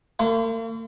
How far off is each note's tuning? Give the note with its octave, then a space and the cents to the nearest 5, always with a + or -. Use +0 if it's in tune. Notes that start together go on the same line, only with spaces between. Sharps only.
A#3 -45 C6 -45